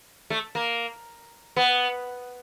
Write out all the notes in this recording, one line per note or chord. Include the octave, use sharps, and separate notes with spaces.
A3
A#3
B3